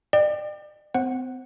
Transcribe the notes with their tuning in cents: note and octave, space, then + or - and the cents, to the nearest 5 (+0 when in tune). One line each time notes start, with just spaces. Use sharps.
D5 +40 G5 +0
C4 -40 C5 +25 F#5 +0